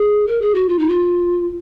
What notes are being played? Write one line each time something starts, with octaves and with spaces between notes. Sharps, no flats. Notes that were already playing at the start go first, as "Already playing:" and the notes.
Already playing: G#4
A#4
G#4
F#4
F4
D#4
F4